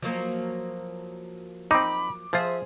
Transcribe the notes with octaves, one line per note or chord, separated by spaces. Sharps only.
F3 F#3 A#3
C4 D#4 B5 D6
F3 F4 G#4 C5 E5